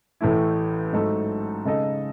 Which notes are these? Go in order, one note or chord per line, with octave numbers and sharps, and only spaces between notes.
A1 A2 E3 A3 E4
G#2 F#3 A3 D#4 A4
C#3 G#3 D#4 A4 D#5